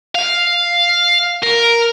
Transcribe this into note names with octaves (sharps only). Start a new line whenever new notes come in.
F5
A#4